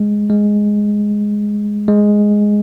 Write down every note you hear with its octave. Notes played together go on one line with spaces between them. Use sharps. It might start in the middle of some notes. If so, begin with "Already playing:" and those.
Already playing: G#3
G#3
G#3